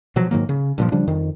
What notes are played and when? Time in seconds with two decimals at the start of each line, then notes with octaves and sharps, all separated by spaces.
0.16 B2 F3 F#3
0.31 G#2 D#3 F#3 A#3
0.49 C#3
0.78 G2 A#2 F3
0.92 C#3 F3 G3 D4
1.07 F2 D#3